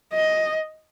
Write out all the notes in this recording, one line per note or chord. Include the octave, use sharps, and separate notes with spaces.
D#5